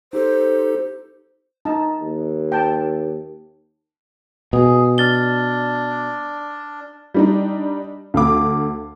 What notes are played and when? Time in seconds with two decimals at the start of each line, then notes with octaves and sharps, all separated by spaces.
0.13 D#4 G4 A4 C5
1.65 D#4 A5 A#5
2.01 D#2
2.52 G5 A5
4.53 B2 G#4
4.98 D4 F6 A6 G7
7.14 G3 D4 D#4
8.14 D2 F5 D6